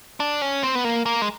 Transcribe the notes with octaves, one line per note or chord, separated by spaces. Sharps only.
D4
C#4
C4
B3
A#3
A#3
G#3